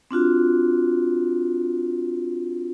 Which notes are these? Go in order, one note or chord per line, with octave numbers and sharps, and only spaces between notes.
C4 D4 F4 F#4